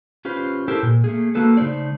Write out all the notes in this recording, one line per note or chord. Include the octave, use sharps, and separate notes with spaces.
C#4 F4 G4 B4 C5
E4 G4 A4 A#4 C5
A#2
A3 A#3 G#4
A#3 F#4 A4 B4
C#3 A3 D#4 C5 D5